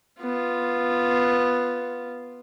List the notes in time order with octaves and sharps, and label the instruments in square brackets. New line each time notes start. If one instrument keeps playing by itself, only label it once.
[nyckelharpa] B3 F4